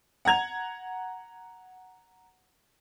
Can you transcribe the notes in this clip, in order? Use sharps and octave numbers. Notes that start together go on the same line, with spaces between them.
F#5 A#5 G#6 F7